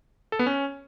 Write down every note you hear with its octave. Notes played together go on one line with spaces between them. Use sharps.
A4
B3
C#4